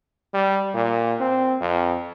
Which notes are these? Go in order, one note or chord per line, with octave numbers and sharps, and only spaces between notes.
G3
A#2
C4
F2